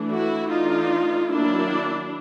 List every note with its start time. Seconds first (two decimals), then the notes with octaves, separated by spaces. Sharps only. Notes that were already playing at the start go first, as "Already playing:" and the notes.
Already playing: E3 A3 D4
0.10 E4 F#4
0.50 E3 A3 D4 D#4 F4
1.29 D#3 F#3 A#3 D4 E4